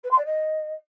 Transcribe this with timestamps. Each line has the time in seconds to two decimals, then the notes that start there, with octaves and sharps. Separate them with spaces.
0.03 B4
0.11 C6
0.18 D5
0.25 D#5